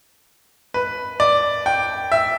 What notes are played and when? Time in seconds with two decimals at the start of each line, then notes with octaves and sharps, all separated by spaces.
0.74 B4
1.20 D5
1.66 G5
2.12 E5